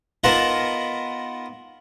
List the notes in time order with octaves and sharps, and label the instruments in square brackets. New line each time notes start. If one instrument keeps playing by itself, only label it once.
[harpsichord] B3 D#4 F4 A#4 F#5 A5